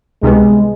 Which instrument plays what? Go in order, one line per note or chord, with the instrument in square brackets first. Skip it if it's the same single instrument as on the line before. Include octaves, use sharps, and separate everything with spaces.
[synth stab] C#2 C3 D#3 G3 B3 [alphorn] G#3